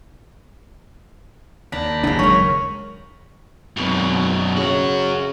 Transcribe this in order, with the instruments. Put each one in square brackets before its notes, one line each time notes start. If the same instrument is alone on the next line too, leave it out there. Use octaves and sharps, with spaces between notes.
[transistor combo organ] D#2 A#5 B5 [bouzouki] D4
[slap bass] F#1 G#2 D4 [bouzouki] F#3 G#3
[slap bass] F#1 F#3 G#3 [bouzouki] C#4 A#4 [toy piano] C#6
[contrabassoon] G#1 [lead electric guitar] F#2 B2
[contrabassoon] C#3 [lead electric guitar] C#4 F#4